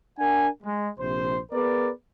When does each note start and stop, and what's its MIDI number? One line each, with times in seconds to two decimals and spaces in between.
0.19 0.48 62
0.19 0.48 70
0.19 0.48 78
0.19 0.48 80
0.63 0.88 56
0.99 1.38 34
0.99 1.38 48
0.99 1.38 72
1.52 1.89 59
1.52 1.89 68
1.52 1.89 70
1.52 1.89 71
1.52 1.89 74